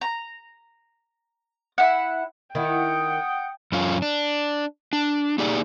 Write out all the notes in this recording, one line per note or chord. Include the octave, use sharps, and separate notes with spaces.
A#5
E4 F#5
D#3 E4 F#5 G5 D#6
F#2 C#4 F4
D4
D4
A#3 D#4 G4 G#4 D5